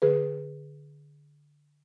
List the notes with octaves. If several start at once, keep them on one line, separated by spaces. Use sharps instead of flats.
D3 G#4 B4